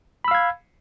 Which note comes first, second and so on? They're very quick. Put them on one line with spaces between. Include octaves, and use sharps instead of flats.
B5 E6 F5 G#6